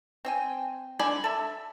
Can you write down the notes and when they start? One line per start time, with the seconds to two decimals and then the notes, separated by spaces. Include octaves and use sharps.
0.25 C4 G5 G#5
0.99 D3 D5 G#5 B5
1.24 A4 E5